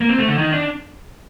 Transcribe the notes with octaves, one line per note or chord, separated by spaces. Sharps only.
A#3
C4
A3
D3
D#3
D4